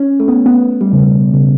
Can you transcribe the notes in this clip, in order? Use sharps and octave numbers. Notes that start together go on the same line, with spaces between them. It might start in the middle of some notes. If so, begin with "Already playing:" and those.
Already playing: C#4
A3
B3
B3
G3
C#3
B2
C#3